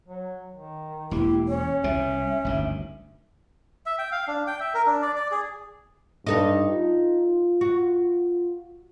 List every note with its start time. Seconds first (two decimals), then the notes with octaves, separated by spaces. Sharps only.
0.08 F#3
0.53 D#3
1.11 E1 A#3 E4 G4
1.48 C#4 C#5
1.84 C2 B2 E5
2.45 G1 D2 D#3
3.86 E5
3.98 G5
4.11 F5
4.28 D4
4.47 G5
4.60 E5
4.74 A#4
4.87 D4
5.02 D5
5.16 D5
5.31 G#4
6.27 G2 D#4 A4 D#5
6.70 F4
7.61 F#4